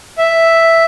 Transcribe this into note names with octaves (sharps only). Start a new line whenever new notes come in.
E5